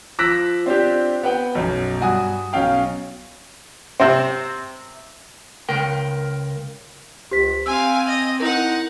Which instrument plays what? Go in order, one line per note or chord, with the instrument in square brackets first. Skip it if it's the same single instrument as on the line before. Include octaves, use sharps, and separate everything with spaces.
[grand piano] F3 D6 E6 F#6 A#6 B6
C4 D4 F4 G4
B3 F#5 G5
B1 F#2
G2 F#4 G#5 D#6
B1 C#4 F5 G5
[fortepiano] C3 C4 [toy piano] E5
[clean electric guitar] C#2 A#4 G5
[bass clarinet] C#2 [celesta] G4 C5 B6
[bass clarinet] C4 [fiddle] F5 G#5 [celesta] E6
[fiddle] D#5
[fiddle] D#4 F#5 [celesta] E4 A#4